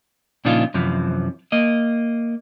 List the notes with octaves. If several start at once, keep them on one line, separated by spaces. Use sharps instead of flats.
A#2 C#3 F3 D4 D#4 F4
F#2 C3 E3 F3
A#3 D#5